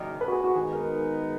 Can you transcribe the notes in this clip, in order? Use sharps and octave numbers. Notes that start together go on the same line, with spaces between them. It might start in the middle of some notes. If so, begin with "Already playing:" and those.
Already playing: F#1 F#2 D#3 D5
B4
F#4
G#4
F#4
D#3 G#3 B3 D#4 G#4
A#4